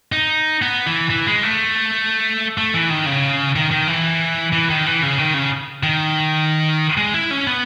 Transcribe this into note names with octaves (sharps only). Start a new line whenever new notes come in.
D#4
B3
E3
E3
G#3
A3
A3
E3
D#3
C#3
D#3
D#3
E3
E3
D#3
E3
C#3
D#3
C#3
D#3
G#3
E4
C#4
B3